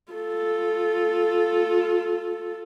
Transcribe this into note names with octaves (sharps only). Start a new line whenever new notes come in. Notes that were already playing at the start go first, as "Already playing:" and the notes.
F4 A4